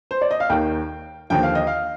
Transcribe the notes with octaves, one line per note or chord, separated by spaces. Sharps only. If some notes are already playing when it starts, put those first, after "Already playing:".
C5
D5
D#5
F5
D#2 D#3 G5
D#2 D3 F3 G5
F5
D#5
F5